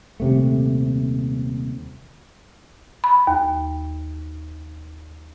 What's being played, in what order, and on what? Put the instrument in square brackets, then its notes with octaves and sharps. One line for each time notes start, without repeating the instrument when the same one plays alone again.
[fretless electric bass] D#1 C3 A3
[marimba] B5
D#2